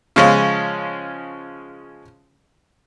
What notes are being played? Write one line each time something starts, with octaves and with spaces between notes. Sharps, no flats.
C#3 F3 G#3 C#4